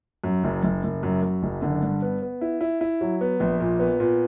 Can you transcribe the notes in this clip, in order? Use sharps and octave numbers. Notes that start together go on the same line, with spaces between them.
F#2
F#1
F#1
F#1
F#2
F#2
F#1
D3
G2
B3
B3
E4
E4
E4
F#3
B3
A#1
A#2
B3
A#2